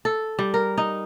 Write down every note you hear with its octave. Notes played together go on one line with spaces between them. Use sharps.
A4
G3
A#4
D#4